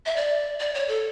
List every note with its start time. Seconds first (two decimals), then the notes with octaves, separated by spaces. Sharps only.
0.06 E5
0.16 D5
0.60 D5
0.74 C#5
0.88 A4